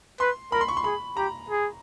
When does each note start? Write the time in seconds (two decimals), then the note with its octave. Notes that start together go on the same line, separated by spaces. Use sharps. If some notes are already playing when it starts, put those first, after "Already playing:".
0.20 B4 C6
0.52 A#4 B5
0.61 C6
0.68 C#6
0.77 C6
0.84 G#4 B5
1.17 G4 A#5
1.50 G#4